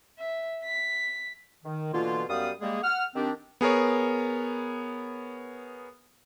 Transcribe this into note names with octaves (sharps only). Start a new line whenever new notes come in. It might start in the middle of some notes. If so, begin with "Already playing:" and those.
E5
B6
D#3
B2 D3 E3 A#3 F4
F#2 G3 B3 F5 D#6
G3 G#3 A#3 G#4
F#5 F6
D#3 C4 D4 G4
B3 G#4 A#4 C#5